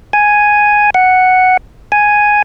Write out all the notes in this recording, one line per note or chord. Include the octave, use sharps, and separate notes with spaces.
G#5
F#5
G#5